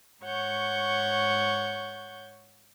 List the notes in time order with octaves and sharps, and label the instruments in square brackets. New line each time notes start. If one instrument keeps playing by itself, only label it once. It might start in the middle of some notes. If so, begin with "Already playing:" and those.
[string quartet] G#2 C#5 F#5 C#6 G6